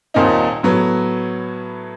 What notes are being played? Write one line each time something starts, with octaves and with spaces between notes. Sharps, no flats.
D#1 A#2 C4 D#4
A2 F#3 B3